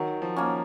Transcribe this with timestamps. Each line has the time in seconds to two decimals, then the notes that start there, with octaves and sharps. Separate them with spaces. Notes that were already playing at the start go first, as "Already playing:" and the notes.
Already playing: D#3 F#3
0.22 F3
0.36 A#3 C#4